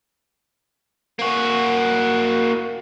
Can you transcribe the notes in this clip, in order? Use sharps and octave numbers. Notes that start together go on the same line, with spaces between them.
A#3 F#4